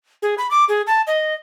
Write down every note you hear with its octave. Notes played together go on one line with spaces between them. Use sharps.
G#4
B5
D6
G#4
A5
D#5